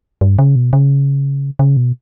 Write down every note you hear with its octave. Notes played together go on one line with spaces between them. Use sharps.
G2
C#3
B2
C#3
C#3
B2